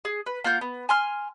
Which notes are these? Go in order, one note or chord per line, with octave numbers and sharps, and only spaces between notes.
G#4
B4
A#3 F4 F#5 G6
B3
G#5 C6 F6